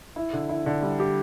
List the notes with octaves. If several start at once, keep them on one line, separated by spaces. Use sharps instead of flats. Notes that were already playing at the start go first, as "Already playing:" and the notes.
E4
D3
E4
D3
G3
G4